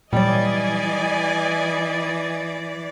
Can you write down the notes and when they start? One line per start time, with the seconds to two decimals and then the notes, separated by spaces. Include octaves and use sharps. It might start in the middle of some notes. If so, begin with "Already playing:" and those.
0.13 A#2 E3 F#3 G3 D5 D#5 G#5